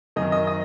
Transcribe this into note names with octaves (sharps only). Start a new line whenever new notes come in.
F#2 D#3 D#5
D#5
D#5